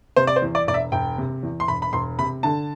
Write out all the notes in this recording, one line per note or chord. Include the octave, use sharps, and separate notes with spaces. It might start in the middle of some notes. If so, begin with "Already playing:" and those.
C3 C5
D5
C5
E2
D5
E1 D5
E5
E1 G5
C3
E2
C6
E1 B5
B5
E1 C6
C3 B5
D3 A5